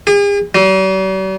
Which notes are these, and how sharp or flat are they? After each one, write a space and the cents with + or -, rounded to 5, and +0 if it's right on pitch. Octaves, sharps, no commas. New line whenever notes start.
G#4 -45
G3 -45